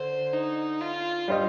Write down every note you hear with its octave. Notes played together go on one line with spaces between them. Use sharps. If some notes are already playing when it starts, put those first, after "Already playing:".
Already playing: D3 C5
D#4
F4
G3 D4 F4 C5 D#5